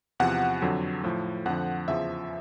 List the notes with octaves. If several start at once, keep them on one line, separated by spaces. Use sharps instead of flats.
E2 C3 F3 F#5
F2 D3 F#3
A2 F3
F2 D3 F3 F#5
E2 C#3 F3 E5